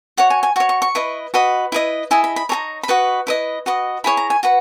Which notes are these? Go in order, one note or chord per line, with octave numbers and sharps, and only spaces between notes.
F#4 C#5 F#5
G#5
G#5
F#4 C#5 C#6
C#6
C#6
E4 B4 D#5
F#4 B4 D#5 B5
E4 B4 D#5
E4 G#4 D#5 G#5
B5
B5
D#4 G#4 C#5 A#5
B5
F#4 B4 D#5 C#6
E4 B4 D#5
F#4 B4 D#5
E4 G#4 C#5 B5
A#5
G#5
F#4 B4 F#5